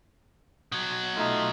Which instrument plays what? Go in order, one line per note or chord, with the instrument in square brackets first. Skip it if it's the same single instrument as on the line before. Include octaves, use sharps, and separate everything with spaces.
[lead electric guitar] B2 F#3
[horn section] A3 D#4 F4